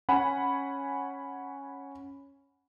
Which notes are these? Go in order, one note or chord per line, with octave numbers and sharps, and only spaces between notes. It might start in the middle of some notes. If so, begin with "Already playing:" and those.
C#4 F#5 G#5 B5